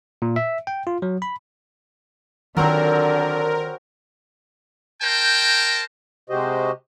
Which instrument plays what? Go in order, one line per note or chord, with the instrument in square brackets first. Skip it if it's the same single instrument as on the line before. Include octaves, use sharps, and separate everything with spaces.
[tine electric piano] A#2
E5
G5
F4
F#3
B5
[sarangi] D3 [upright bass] D#3 F4 [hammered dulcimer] F#3 C4 [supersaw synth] A#4
[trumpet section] A#4 C5 G5 A5 A#5
[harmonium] C3 G#3 F#4 G4 C5 D#5